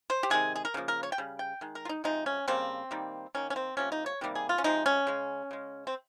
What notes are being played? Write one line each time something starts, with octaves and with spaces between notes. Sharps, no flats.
C5
G4
C3 D#3 G#3 G#4
G#4
A#4
C#3 F3 A#3
A#4
C#5
G5
C#3 G3
G5
D#3 G#3
A#4
F4
D#4
C3 F3 G#3 D#4
C#4
C#3 G3 A#3 C4
D#3 G3 A#3
D#3 A#3 C#4
C#4
C4
C3 F3 A#3 C#4
D#4
C#5
C3 D#3 G3 A#3
G#4
F4
C#4
C3 F3 G#3 D#4
C#4
C#3 G#3
C#3 G#3
C4